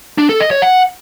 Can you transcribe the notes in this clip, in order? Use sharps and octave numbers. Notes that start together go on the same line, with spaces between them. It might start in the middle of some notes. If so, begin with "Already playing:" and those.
D4
A4
D#5
C#5
F#5